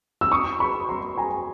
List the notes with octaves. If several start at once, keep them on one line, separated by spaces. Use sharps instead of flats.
E6
C#6 D#6
B5 C#6
A#5 C6
G#5 A#5